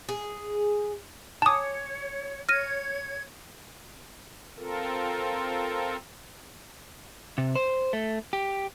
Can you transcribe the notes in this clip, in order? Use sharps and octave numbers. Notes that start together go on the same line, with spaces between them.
G#4
C#5 G#5 A5 D6 D#6
C#5 F6 G#6 A#6 D#7
C4 F4 A4 A#4
C3
C5
A3
G4